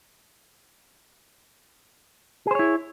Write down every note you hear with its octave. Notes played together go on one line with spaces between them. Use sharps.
E4 G#4 C5 C#5